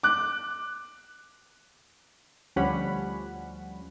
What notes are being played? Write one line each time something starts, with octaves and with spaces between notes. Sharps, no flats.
D6 F#6
D2 F3 G3 C#4 F#5 B5